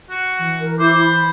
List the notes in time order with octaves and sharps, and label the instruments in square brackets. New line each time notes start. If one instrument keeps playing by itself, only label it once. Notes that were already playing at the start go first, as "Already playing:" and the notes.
[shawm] F#4
[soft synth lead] E3
[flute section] A#4
[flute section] E4 D6 [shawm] C5
[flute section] B5